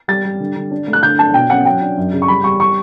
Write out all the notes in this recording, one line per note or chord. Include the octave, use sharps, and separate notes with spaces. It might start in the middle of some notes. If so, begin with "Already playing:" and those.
G3 A6
G3
D3
D3
D4
A3
F#6
D3 G6
D4 A5
B2 G5
C#4 F#5
F#3 G5
D4
F#2
C#3
C#6
G3 B5
G3 C#6
C#6